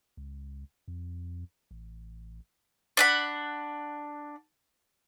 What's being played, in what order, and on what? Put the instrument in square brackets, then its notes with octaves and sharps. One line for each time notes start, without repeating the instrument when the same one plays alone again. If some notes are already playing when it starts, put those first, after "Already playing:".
[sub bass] C#2
F2
A1
[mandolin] D4 F#5 B5